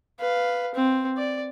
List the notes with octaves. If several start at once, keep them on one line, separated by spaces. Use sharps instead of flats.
B4 F5
C4
D5